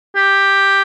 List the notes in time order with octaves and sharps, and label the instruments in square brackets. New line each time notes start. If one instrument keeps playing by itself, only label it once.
[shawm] G4